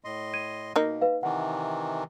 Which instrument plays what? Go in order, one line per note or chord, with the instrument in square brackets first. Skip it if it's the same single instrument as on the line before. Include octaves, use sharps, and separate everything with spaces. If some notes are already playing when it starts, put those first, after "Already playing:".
[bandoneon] A2 D#5 C6
[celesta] G#6 D#7
[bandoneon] B2 [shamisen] A#3 D#4
[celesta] B4 F5
[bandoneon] C3 D#3 E3 [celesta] F#5